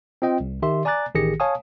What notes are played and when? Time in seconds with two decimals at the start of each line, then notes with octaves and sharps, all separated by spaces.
0.22 C4 F4 D#5 G5
0.40 C2
0.62 D#3 G4 E5 C6
0.85 D5 G#5 A#5 D6 F#6 A6
1.15 A1 D#3 G4 G#4 A#6 C#7
1.40 C#5 F5 G#5 A5 D#6